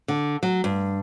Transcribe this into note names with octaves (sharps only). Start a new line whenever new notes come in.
D3
F#3
G2